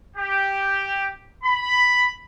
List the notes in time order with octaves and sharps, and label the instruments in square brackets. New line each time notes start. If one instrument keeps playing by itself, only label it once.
[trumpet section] G4
B5